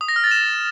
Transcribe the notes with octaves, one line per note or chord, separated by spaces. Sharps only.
D#6
A#6
F6
A6
E7